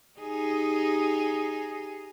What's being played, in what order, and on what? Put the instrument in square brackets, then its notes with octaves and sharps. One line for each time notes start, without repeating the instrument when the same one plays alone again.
[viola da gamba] D#4 G4 G#4